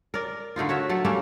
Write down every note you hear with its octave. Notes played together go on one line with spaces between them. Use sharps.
A#4 D5
D3 A3 D#4 F4
F#4 C#5 E5
F#3 A3 A4
G3 A3 A#3 C#4